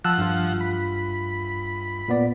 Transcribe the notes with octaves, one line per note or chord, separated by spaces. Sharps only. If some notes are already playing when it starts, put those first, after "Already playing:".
F3 F#5 A5 E6 F#6
G2 F4
B5
A#2 B3 D5